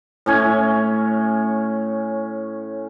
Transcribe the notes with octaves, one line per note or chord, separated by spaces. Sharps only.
A2 C#4 G#5